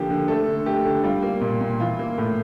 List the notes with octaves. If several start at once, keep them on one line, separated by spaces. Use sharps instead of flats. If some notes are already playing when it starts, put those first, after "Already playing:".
Already playing: D3 F3 A#3 G4
D3
A3 A4
D3
A3 G4
D3
G3 F4
A#3
A#2
A#2
E3 F4
A#3
A2